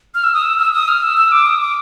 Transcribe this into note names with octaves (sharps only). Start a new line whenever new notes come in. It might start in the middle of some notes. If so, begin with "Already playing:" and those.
F6
E6
D#6
E6
E6
D#6
F6
E6
E6
D6
D#6
D6